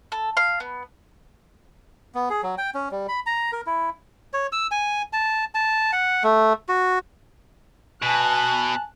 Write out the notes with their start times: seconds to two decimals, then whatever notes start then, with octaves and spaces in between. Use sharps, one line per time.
0.12 A4
0.37 F5
0.60 B3
2.15 B3
2.30 G#4
2.43 F#3
2.58 G5
2.74 C#4
2.91 G3
3.08 B5
3.26 A#5
3.52 A#4
3.66 E4
4.34 C#5
4.52 E6
4.71 G#5
5.13 A5
5.55 A5
5.93 F#5
6.24 A3
6.69 F#4
8.03 B2 G#5 A5 F#6